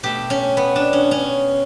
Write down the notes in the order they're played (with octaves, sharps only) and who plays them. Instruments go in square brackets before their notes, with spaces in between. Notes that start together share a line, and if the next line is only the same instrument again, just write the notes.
[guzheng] B2 A3 G4
C#4
B3
D4
C#4
C#4